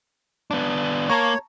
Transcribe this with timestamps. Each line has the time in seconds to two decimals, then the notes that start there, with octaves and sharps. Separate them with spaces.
0.51 B3 D4
1.09 A#3 C#5 A5 A#5 C#6